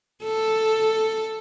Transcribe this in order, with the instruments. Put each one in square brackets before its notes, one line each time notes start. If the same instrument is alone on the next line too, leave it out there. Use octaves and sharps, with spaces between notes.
[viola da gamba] A4